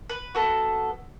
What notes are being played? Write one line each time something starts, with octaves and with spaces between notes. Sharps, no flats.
B4
B3 F#4 A4